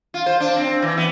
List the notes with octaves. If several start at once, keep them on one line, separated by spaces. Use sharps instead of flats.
F4
C5
D4
C4
E3
B3